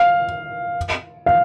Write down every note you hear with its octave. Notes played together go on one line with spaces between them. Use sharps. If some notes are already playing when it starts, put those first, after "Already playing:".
Already playing: F5
F5